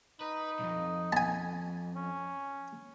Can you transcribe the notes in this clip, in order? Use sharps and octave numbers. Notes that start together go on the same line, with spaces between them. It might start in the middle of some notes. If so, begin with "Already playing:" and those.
D#4 B4
B1 F2
G#5 A5
C#4